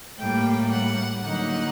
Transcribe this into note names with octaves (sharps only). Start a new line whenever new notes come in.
A2 G3 A#3 G5
F#5
D3 F#3 A#3 D#4 F#5